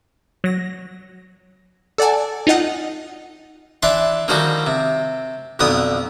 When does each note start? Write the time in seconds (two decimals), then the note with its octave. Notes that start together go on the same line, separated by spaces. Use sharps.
0.44 F#3 A#6
1.98 A4 D5 F#5 G#5 A5
2.47 D#4 F4 D#5 F#5
3.83 E3 D4 E5 A5 C6
4.28 D3 D#3 F3 G3 F#4 A4
4.67 C3
5.59 B1 F2 D3 B3 D#6